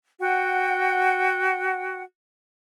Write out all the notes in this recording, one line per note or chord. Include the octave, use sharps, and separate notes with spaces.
F#4 F#5 G5